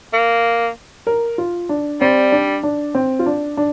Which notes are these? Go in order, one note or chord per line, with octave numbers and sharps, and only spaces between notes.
A#3
A#4
F4
D4
G3 C4
D4
D4
C4
F4
D4
D4